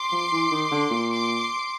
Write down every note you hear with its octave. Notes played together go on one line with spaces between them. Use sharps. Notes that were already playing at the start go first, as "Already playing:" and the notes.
Already playing: C6 D6
F3
E3
D#3
D3
A#2
C6 D6